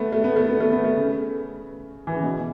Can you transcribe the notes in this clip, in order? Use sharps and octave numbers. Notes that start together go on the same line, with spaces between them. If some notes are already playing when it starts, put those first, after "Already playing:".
Already playing: A3 B3
A3
B3
A3
B3
A3
B3
A3
C#3
E3
C#3
B2